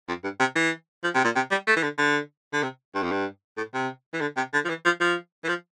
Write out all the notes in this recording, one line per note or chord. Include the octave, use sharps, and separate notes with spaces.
F2
G2
C3
E3
F3
C3
A#2
C3
G3
A3
E3
D3
D3
D3
C3
G2
F2
G2
A2
C3
E3
D3
C3
D3
F3
E3
F3
F3
E3
F3